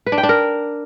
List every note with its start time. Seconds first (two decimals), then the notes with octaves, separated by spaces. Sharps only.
0.06 B4
0.12 D4
0.18 G5
0.23 D4
0.29 A#4